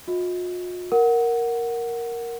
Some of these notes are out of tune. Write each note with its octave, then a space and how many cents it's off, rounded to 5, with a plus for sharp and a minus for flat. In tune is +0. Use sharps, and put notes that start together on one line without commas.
F4 +45 D#5 +35
A#4 +0 F#5 +0